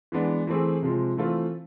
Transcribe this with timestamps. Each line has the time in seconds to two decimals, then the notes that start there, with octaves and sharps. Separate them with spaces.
0.12 E3 G#3 B3 D4
0.47 E3 A3 C4 G#4
0.82 C3 F3 G#3
1.17 E3 A3 C4 F4